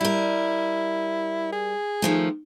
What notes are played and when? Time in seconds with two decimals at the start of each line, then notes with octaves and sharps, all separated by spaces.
0.01 G3 E4 A#4
1.52 G#4
2.02 D#3 F3 A3